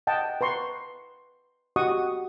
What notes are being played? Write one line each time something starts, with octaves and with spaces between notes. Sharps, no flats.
D#5 F#5 G5 A5
B4 A#5 C6 C#6
F#4 G4 D#5 F#5 C#6 D#6